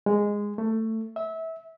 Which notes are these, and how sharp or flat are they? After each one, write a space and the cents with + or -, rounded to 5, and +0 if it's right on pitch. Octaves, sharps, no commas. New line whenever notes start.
G#3 -10
A3 +15
E5 -25